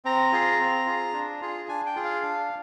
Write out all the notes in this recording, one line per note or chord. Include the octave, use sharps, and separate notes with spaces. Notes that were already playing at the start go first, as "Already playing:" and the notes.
C4 A#5
F4 G#4
C4
F4 G#4
D4
F4 G#4
D4 G#5
G5
F4 G#4
F5
D4